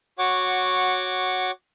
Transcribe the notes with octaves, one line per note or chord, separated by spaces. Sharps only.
F#4 C#5 F#5 C#6 D6